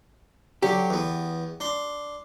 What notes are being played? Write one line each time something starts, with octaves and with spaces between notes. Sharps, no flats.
D3 F#3 G4
E2 B3
D4 C6